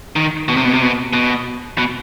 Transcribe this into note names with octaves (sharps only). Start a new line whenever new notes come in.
D#3
B2
C3
B2
C3
B2
B2
B2